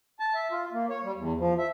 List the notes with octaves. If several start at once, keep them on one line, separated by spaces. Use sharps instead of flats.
A5
E5
F4
A#3
C#5
G3
E2
F3
E5